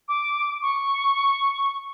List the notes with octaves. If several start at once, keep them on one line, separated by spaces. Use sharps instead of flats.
D6
C#6